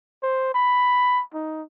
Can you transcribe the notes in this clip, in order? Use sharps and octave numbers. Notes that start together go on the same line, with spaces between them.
C5
B5
D#4